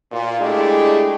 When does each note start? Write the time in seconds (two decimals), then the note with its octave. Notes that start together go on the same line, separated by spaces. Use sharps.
0.11 A#2 F4
0.40 G#3 A3 D4 E4 G4 G#4